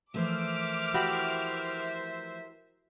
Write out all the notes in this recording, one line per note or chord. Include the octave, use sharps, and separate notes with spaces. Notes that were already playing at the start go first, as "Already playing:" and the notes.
E3 F3 A3 A#4 C5 E5 D6 F6
E4 F#4 G4